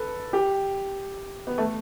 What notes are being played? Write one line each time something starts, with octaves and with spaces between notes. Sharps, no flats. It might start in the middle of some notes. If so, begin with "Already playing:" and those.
Already playing: A4 B4
G4
B3
A3